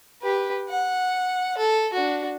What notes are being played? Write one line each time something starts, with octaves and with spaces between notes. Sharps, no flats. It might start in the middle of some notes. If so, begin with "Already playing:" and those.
G4 B4
F#5
A4
D4 F#4